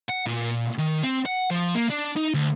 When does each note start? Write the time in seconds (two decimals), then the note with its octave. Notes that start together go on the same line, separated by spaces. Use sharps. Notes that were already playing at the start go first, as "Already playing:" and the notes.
0.09 F#5
0.26 A#2
0.78 D#3
1.04 C4
1.26 F#5
1.50 F3
1.75 A#3
1.90 D4
2.16 D#4
2.34 D2